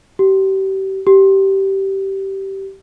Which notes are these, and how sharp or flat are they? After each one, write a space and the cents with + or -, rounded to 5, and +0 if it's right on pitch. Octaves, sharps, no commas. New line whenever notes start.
G4 -30
G4 -15